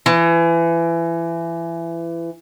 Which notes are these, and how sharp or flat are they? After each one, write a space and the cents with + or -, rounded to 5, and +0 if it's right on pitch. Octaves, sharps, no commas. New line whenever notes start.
E3 +25